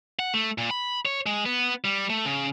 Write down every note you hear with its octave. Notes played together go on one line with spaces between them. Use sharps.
F#5
A3
A#2
B5
C#5
G#3
B3
G3
A3
C#3